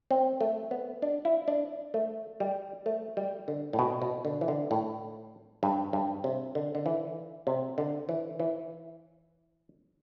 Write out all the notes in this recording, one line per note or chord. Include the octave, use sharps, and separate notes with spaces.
C4
A3
B3
D4
E4
D4
A3
G3
A3
G3
D3
A2
B2
B2
D3
E3
D3
A2
G2
G2
C3
D3
D3
E3
C3
D3
E3
E3